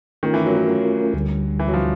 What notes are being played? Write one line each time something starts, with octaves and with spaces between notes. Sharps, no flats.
D#3 A3 C#4 F4 A#4
E3
F#3
F#3
F#3
D2 D3 G3
E3
F#3
F3